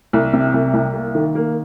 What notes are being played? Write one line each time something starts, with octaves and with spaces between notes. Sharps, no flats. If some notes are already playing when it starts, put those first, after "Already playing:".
C2
C3
C2
C2
A#3
D#3
A#3